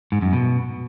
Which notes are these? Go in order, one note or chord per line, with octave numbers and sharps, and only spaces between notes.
G#2
F#2
B2